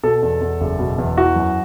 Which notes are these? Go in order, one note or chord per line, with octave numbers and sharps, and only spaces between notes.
B2 A4
E2
E2
F#1
B2
E2
E3 F#4
F#2